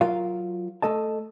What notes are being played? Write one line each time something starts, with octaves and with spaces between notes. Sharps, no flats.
F#3 F4 A#4 F5
A3 A4 D#5 A5